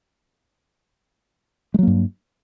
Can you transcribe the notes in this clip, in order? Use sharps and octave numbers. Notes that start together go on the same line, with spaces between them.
G2 F#3 G#3 A#3